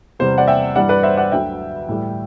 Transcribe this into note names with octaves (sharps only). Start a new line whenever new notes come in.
E2 C3 G3 C5
D5 F#5
E5 G5
G2 E3 G3 D5 F#5
B4 D5
C5 E5
D5 F#5
D2 D3 F#3 E5 G5
A2 E3 G3